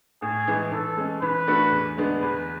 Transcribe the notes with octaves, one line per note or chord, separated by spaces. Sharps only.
A2 G#4
E3 G#3
E3 A4
G#3 C#4
E3 B4
A3 D4 F#4 A4
E2
D3 G#3 B3 D4
E2 B4